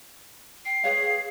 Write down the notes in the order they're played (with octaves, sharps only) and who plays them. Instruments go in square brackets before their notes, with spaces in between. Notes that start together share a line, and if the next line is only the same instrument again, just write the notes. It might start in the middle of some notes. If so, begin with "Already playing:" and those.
[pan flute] G5 [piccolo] C7
[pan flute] G#4 [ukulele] B4 C#5 F5